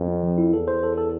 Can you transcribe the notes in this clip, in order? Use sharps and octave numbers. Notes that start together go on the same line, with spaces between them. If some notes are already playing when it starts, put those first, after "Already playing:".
Already playing: F2
C4
F3
E4
E2 A4
C5
A4
A4